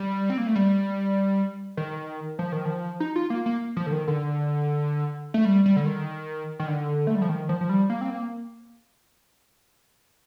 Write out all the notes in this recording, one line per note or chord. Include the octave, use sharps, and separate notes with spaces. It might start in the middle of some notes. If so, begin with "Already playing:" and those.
Already playing: G3
C4
A#3
A3
G3
D#3
F3
D#3
F3
D#4
F4
A#3
A#3
F3
D3
D#3
D3
A3
G3
G3
D3
D#3
D#3
D3
A3
G3
F3
D#3
F3
F3
G3
A#3
C4
A#3